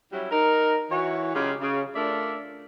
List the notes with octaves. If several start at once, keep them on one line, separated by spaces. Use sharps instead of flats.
F#3 G3 C#4 E4
D#4 A#4
E3 F#4 C#5
C#3 F#3 G#3 F4 G4 G#4
C#3
A3 D4 F4 A#4 D5 E5